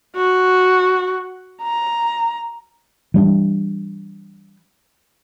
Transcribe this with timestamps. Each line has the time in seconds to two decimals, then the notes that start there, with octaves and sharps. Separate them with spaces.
0.16 F#4
1.62 A#5
3.14 E3 G3 D4